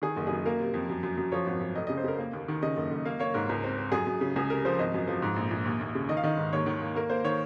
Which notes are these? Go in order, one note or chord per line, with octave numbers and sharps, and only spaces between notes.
D#3 G#4
F#1
F#2 G#4
A#3 A#4
C3
F2
F#2
F#2
F#2
F3 C#5
G#1
F#2
F1 D#5
C#3 D#5
C5
C#3 A#4
A#3
D#2
D#3
C#3 D#5
F#1
F#1
A#3 F5
A#3 C#5
G#2 A#4
C#2
C4
C4
F#2 G#4
F#2
C#3
C#2 G#4
C3 A#4
F3 C5
G#1 D#5
F#2
F3
G#2
A#1
A#1
D#2
D#2
C#3
D#3 D#5
F5
D#3 D#5
G#2
D#2 C#5
D#3
A#3
A#3 A#4
A#3 C5
D#3 C#5